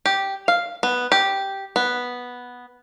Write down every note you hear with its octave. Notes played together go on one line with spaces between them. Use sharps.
G4
F5
B3
G4
B3